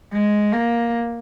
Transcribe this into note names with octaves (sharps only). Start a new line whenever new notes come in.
G#3
A#3